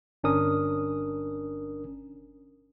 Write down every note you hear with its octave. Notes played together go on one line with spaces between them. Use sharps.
G1 C#4 D4 A#4 D#6